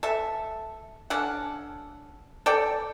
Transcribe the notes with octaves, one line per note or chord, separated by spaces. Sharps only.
A4 E5
C#4 D4 A4 F#5
A4 D5 G5